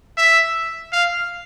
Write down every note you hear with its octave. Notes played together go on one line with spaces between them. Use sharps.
E5
F5